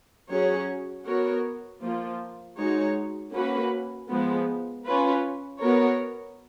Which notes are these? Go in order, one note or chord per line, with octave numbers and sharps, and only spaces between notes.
F#3 C#4 G#4 C#5
B3 F#4 A#4 C#5
F3 A#3 F4
G#3 D#4 F#4 C#5
A#3 C#4 F#4 B4
F3 G#3 B3
C#4 F4 B4
B3 F#4 A#4 C#5